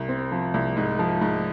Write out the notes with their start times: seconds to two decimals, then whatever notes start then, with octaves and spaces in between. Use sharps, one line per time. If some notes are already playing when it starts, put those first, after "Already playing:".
Already playing: C2
0.09 C4
0.32 F3
0.54 C2
0.77 G#2
0.99 F3
1.21 G#2